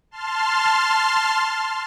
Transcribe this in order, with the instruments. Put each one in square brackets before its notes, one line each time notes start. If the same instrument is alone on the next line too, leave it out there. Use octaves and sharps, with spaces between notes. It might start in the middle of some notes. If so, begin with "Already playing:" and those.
[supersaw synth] A5 C6 F6